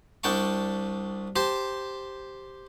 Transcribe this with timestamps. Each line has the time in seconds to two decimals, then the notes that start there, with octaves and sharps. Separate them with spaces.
0.24 C2 D4 G5 A5 C#6
1.36 G4 C5 A5